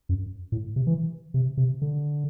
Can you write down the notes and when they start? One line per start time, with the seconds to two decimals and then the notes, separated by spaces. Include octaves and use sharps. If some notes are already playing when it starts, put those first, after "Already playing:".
0.09 F#2
0.52 A2
0.76 C3
0.87 E3
1.34 C3
1.57 C3
1.82 D3